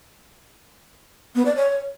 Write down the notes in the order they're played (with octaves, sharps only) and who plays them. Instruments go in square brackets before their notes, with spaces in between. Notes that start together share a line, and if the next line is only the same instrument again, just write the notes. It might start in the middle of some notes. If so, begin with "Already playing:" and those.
[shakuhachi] B3
D5
C#5